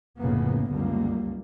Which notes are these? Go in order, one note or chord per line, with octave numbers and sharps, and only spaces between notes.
F1 A2 C#3 F3 A#3 B3
C#2 F#2 D3 G3 A#3